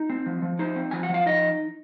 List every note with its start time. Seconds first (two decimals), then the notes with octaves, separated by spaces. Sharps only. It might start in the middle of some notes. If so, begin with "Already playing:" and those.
Already playing: D#4
0.10 C4
0.26 F3
0.42 F3
0.59 D#4 C5
0.76 C4
0.91 F3 G#5
1.03 F#5
1.09 F3
1.14 F5
1.26 D#4 D#5